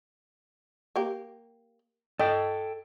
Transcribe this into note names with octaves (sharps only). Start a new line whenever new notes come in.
A#3 G4
A4 D#5 G5